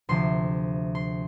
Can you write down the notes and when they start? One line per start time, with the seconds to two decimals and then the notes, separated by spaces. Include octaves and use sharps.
0.09 D2 C3 F3 C6
0.95 C6